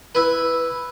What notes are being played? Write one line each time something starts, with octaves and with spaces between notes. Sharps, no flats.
E4 B4